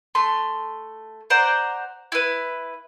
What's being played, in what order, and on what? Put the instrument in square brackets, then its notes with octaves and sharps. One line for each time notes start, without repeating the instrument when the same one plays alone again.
[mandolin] A3 C6
C5 D5 F#5 A#5
E4 B4